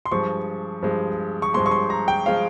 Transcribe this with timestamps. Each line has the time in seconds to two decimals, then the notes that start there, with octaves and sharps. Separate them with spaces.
0.06 C6
0.11 G2 F3 G#3 C#6
0.82 G2 F3 G#3
1.42 C#6
1.54 G2 F3 G#3 C6
1.66 C#6
1.71 C6
1.90 A#5
2.08 G5
2.26 F3 G#3 F5